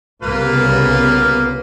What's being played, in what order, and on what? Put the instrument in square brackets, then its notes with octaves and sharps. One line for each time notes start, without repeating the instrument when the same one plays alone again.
[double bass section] C2 C#3 B3 [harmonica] A#3 F4 B4